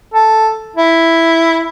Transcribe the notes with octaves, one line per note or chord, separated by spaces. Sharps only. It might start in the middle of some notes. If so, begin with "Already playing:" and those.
A4
E4